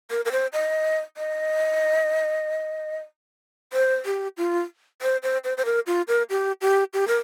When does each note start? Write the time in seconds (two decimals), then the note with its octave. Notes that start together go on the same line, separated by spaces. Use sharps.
0.11 A#4
0.25 A#4
0.32 C5
0.53 D#5
1.17 D#5
3.73 C5
4.05 G4
4.37 F4
5.02 C5
5.23 C5
5.44 C5
5.58 C5
5.65 A#4
5.87 F4
6.08 A#4
6.30 G4
6.61 G4
6.94 G4
7.08 A#4